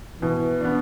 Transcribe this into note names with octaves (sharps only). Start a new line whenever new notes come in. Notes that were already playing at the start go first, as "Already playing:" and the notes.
B2 E3
B3 D4